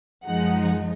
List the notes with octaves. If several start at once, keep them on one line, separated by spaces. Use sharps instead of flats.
F#2 F3 G#3 D#4 F#5